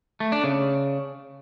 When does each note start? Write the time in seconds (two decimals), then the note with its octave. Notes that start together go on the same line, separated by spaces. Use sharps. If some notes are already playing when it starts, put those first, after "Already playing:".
0.20 A3
0.32 D4
0.44 C#3